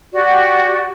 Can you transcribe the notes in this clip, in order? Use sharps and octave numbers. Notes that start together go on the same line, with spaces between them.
F#4 G4 D5